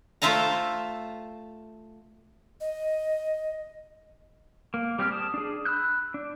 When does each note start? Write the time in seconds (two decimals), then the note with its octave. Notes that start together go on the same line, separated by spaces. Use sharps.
0.22 A3 F4 C5 E5 A5 A#5
2.61 D#5
4.74 A#3
4.99 G3 C4 G4 G#4 F6
5.12 A5 D#6
5.34 D4 G#4
5.65 B5 E6 F#6 G6
6.14 D4